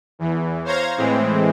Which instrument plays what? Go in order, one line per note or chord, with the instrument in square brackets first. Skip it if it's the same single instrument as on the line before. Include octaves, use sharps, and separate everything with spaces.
[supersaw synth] E2 E3
C5 C#5 F5 A#5 G#6 A#6
A2 E3 G#3 C4